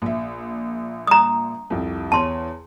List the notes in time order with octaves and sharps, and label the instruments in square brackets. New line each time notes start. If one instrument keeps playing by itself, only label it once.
[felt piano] A#1 E5
[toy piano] A#5 D#6
[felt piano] C2 F2
[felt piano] E2 C#5 [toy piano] A5 C6